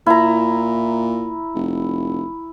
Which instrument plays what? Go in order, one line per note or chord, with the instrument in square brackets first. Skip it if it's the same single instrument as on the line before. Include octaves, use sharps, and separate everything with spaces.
[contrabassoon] A#2 [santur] E4 A#5
[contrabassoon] F1